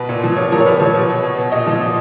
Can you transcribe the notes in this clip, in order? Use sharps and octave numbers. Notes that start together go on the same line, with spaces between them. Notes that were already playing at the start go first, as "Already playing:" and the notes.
Already playing: B2 B4
A#2
F3
A#2 C#5
F3 A#4
C#5
A#2 B4
F3 C#5
B2
B2
B2
B2
A#2 D#5
F3
A#2